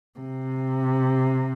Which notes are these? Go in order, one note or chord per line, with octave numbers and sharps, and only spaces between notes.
C3